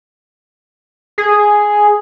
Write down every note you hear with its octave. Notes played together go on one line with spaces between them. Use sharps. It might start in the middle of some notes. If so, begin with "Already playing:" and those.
G#4